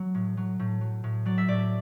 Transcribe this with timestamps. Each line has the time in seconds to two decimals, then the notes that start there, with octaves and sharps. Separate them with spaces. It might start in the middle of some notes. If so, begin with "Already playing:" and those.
Already playing: F#3
0.15 A2
0.37 F#3
0.59 A2
0.81 F#3
1.04 A2
1.25 F#3 D5
1.38 E5
1.48 A2 D5